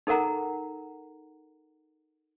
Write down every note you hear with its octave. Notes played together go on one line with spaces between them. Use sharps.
D#4 A4 A#4 F#5 A#5